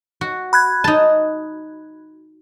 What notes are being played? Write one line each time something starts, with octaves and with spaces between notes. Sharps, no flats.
F#4
B5 F#6 G#6
D#4 A5